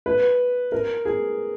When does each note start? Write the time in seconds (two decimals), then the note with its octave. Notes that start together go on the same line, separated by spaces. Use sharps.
0.06 B4
0.72 A#4
1.05 G#4